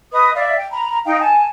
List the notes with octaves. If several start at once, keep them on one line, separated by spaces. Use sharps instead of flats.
B4 D#5 D#6
D5 E5 F5
G5
A#5 B5
D#4 F5 G5
G#5 A5